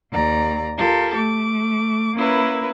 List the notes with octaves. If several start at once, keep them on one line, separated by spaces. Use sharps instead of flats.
D#2 D5 A#5
F4 G4 A4 A#4
A3 D6
A#3 C#4 E4 A#4 B4